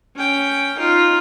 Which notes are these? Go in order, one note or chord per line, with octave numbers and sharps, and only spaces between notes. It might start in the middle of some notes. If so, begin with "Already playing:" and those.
C#4 G5
D#4 F4